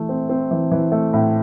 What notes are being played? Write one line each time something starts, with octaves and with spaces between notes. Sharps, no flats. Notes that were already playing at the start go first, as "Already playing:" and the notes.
Already playing: E3 A3
C4
C4
E3
E3
A3
A2